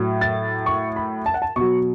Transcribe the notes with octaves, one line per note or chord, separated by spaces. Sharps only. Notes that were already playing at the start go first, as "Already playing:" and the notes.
Already playing: A2 F#3
A6
C#6
B5
A5
F#5
A5
B2 F#3 C#6